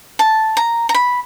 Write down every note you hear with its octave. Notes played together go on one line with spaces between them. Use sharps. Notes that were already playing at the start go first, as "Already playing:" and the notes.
A5
A#5
A#5
B5